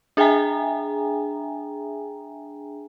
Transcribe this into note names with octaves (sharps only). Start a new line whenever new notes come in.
D4 G#4 E5 G5 G#5 A#5